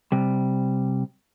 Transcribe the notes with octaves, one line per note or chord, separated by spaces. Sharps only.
C3 G3